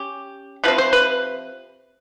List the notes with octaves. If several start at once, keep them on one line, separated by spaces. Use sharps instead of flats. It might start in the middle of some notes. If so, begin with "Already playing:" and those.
Already playing: C#4 G4
C3 F3 C4 B4
C5
B4